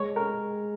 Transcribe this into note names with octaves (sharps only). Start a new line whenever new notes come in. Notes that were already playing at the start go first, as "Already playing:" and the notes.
Already playing: G#3 C#5
A#4